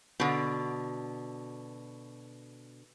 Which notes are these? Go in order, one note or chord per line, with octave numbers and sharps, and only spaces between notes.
B2 D3